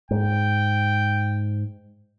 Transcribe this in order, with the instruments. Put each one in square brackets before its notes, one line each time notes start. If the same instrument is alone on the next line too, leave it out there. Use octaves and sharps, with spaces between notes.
[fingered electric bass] G#2 [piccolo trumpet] G5